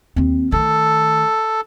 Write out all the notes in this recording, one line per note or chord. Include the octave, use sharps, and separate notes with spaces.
D#2 C4
D#3 A3 A4